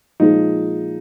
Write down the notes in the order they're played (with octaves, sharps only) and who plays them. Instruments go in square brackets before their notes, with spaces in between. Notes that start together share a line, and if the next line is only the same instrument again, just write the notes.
[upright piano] A#2 F3 G#3 D#4